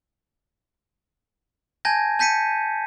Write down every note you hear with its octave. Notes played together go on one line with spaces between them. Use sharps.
G#5 A5 G6 G#6 A#6
A5 G6 B6 C#7 D#7